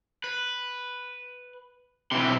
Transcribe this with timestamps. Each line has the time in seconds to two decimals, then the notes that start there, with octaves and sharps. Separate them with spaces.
0.24 B4
2.12 B1 C3 E3 C6